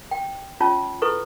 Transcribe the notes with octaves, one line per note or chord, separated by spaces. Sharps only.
G5
C#4 F4 C#5 A5
E4 A4 B4 C#6